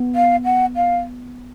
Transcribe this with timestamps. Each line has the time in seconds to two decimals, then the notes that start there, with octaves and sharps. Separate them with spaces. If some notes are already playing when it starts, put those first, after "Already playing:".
Already playing: B3
0.15 F5
0.45 F#5
0.76 F5